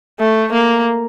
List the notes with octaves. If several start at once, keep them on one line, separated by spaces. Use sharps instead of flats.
A3
A#3